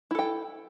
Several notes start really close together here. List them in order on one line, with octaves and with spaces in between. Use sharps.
E4 A4 G5